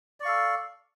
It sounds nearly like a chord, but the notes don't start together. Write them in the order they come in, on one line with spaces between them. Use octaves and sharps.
D5 C#6 F5 A4